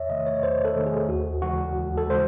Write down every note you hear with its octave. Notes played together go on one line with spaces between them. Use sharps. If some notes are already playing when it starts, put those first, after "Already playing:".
Already playing: E2 C#5 E5
C3 D#3 A3 D#5
C#5
E2 C5
A4
C3 D#3 A3
G#4
D#2 F#4
C#3 E3 G#3 F#4
D#2
A4
C#3 E3 G#3 C5